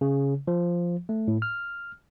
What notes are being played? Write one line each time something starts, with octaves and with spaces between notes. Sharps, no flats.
C#3
F3
A3
A2
F6